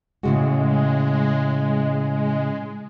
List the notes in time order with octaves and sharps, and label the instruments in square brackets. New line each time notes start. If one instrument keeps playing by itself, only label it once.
[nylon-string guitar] A2 C#3 F#4 [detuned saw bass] G#3